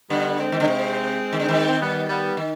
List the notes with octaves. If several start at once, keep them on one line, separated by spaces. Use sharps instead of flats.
D3 G3 B3
G#3 C4
D#3
D3
C3
D#3
D3
D#3
C4
G3 B3
G3 B3
D#3